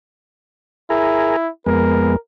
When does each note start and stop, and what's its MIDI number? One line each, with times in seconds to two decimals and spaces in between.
0.90 1.50 64
0.90 1.36 68
0.90 1.36 70
1.66 2.16 41
1.66 2.16 56
1.66 2.16 59
1.66 2.17 70